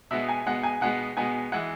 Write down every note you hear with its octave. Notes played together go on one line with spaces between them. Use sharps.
B2 G#3 B3 E5
G#5
B2 G#3 B3 F#5
G#5
B2 G#3 B3 F#5
B2 G#3 B3 G#5
E3 G#3 F#5